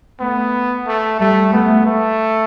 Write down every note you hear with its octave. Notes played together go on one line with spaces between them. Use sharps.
A3 B3
A3
G3 A3
A3 B3
A3